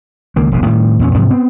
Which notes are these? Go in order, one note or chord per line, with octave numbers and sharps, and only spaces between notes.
C#2 D#3 A#3
E1 A#1 D#2 C3
A2 D#3 G3
E2 A#2 C#4
G#2 C3 F3 F#3
B3 C4